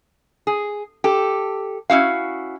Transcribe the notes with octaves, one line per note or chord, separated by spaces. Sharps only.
G#4
G4 A4
C#4 E4 F#4 F5